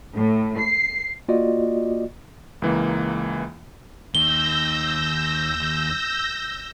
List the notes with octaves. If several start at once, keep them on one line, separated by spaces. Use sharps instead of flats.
A2
C7
A#3 F4 F#4 D5 D#5
C#2 E3 A#3
D#2 D#3 E6 G6 A#6 G7